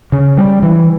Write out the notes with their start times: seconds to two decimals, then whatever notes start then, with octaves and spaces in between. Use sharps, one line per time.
0.12 C#3
0.38 G3
0.63 E3